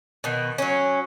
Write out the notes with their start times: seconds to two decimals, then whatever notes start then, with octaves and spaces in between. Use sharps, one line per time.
0.24 B2 D#3
0.58 F#3 C#4